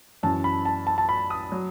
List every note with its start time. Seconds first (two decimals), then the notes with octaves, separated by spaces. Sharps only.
0.23 F#2 E3 A5
0.44 B5
0.65 A5
0.87 A5
0.98 A5
1.09 B5
1.30 D#6
1.52 F#3